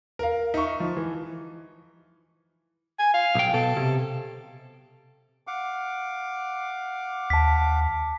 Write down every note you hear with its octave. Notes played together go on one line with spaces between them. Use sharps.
A#4 F5
D#4 E5 C#6
F3
E3
G#5
F5
B1 G5
B2 A4
C3
F5 F#5 D6
D#2 A5 B6